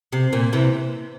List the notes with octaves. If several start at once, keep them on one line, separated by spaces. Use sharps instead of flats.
C3
A#2
C3 E3